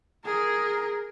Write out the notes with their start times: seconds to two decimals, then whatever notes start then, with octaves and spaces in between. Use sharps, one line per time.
0.25 G#4 A#4